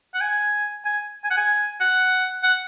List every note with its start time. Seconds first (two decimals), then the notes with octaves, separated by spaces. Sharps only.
0.14 F#5
0.21 G#5
0.85 G#5
1.24 G#5
1.30 F#5
1.37 G#5
1.80 F#5
2.43 F#5